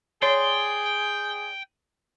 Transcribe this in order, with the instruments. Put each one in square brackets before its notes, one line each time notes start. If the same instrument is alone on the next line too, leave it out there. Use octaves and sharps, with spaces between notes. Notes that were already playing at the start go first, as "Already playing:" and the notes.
[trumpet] G#4 [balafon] C#5 [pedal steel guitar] D5 C6 [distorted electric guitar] G5